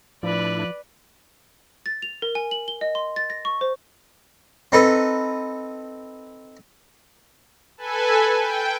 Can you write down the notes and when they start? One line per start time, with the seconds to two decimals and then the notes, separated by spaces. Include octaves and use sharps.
0.23 A2 F3 D4 E4 B4 D5
1.86 A6
2.02 F7
2.22 A#4
2.35 G#5
2.51 F#7
2.68 G7
2.81 D#5
2.95 C6
3.16 A6
3.30 A#6
3.45 C#6
3.61 C5
4.72 C4 D#4 A4 B4
7.77 A4 B4 G#5
8.39 G5